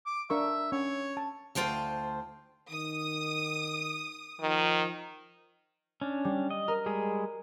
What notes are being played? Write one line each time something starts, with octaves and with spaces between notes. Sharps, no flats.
D6
D4 A#4 E5 C#6
C#4 C#5
A5
D2 F4 C5 G5 A5
D#3 D#6
D#3 F3
C#4 D4
G3
D#5
A#4
G3 G#3 G#4